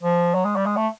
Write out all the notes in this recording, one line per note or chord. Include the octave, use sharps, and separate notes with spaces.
F3
F#3
G#3
G3
G#3
A3